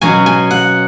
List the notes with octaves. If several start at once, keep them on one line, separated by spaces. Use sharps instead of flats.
B2 F#3 C#4 G#5
G#5
F#5